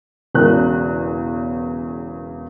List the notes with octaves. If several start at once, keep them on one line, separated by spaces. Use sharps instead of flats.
E1 E2 C#3 A#4 F#6